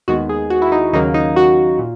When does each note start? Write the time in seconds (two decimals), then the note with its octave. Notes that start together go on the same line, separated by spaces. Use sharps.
0.08 D#2 D#3 G#3 B3 F#4
0.29 G#4
0.50 F#4
0.62 E4
0.72 D#4
0.93 D#2 C#3 F#3 A#3 D#4
1.14 D#4
1.36 F#4
1.79 A#2